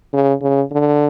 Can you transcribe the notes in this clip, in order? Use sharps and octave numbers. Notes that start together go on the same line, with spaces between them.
C#3
C#3
D3